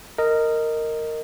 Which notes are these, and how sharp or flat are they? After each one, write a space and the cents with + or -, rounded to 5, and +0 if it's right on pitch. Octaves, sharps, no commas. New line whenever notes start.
A#4 -15 D#5 +0